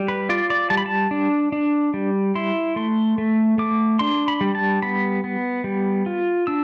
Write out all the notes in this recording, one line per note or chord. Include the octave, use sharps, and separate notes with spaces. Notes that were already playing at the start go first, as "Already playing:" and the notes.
Already playing: G3
B4
F4 D5
D5
G3 A5
B5
A5
D4
D4
G3
E4 C6
A3 C6
A3
A3 D6
D4 C6
B5
G3
A5
B3 B5
B3
G3
F4
D4 E6